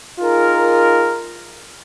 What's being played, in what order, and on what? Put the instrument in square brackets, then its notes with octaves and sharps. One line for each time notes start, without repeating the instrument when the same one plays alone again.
[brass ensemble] D#4 F4 G#4 A#4